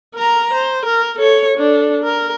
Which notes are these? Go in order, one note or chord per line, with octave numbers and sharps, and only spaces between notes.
A#4 A#5
C5
A#4
A4 C#5
D4 A4
A#4